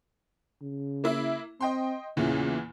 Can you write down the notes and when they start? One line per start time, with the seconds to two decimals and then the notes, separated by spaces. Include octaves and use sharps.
0.62 C#3
1.04 A#3 E4
1.61 C4 D#5 G5 C6
2.17 E2 A#2 C#3 E3